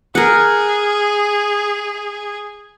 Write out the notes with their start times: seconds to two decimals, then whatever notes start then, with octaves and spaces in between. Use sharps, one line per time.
0.15 G#4 A#4 F#5